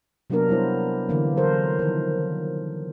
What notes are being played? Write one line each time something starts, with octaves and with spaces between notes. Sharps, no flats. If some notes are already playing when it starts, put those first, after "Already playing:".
C3 F#3 A#3 B3 D4 A#4
G3 B3 E4 C5
D3 E3 A#3
F#3 A4 A#4 C5
D#3 F3